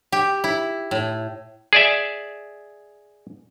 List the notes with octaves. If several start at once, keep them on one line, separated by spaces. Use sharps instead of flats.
G4
E4
A2
G#4 D5 E5